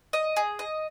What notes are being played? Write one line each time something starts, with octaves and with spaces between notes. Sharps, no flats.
D#5
G#4
D#5